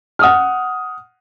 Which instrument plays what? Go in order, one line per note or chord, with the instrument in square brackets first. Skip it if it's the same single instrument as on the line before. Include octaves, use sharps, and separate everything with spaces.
[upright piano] F#5 D#6 F6